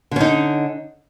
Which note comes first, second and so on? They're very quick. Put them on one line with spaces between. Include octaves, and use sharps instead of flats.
D3 C#4 D#4